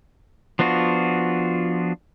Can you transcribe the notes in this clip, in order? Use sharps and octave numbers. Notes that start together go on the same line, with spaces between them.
F3 B3 D4 F4 F#4